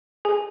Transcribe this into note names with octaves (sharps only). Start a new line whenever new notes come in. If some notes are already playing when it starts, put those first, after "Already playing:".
G#4 G#5